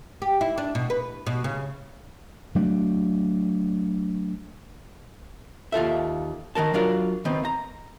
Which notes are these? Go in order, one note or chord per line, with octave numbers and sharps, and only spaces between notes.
G4
E4
D4
B2
B4
B2
C#3
F#3 A3 D4
D#2 F4 A4 E5
D#3 G#3 A#4 A5
F#3 D4 F4 A#4
D#3 B3 C4
A#5